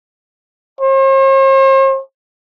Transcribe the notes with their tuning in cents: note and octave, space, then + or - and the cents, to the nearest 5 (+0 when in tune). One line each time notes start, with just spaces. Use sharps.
C5 +45